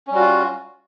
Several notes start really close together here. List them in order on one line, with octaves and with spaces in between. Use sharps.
C#4 G3 F#4 F4